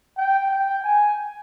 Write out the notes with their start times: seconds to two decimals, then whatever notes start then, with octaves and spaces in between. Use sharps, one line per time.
0.18 G5
0.51 G5
0.84 G#5